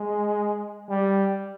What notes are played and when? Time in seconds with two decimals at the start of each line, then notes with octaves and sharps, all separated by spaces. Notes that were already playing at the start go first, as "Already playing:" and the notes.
Already playing: G#3
0.89 G3